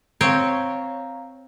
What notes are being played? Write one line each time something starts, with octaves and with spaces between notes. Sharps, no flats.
C4 C#5 F5 A#5